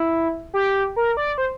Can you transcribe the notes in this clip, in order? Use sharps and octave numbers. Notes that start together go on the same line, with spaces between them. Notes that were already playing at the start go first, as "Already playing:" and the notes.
Already playing: E4
G4
A#4
D5
C5